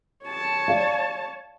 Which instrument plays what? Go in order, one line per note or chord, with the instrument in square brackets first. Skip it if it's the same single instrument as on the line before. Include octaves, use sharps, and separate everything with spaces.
[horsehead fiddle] C#5 A5
[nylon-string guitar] D5 F5